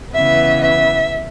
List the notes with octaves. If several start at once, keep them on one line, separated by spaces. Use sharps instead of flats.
C#3 E3 B3 E5
E5